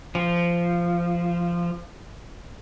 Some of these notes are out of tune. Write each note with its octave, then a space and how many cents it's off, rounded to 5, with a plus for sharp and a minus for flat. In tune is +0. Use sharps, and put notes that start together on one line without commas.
F3 -15